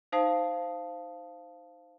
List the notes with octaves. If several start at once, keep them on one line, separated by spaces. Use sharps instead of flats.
D#4 C5 F5 A5 D#6 C7